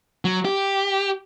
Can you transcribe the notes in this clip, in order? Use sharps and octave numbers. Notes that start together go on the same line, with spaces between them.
F#3
G4